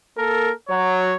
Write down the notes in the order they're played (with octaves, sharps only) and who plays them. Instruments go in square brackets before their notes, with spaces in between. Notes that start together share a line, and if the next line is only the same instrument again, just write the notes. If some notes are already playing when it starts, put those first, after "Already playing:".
[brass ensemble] A#3 A4 A#4
F#3 C#5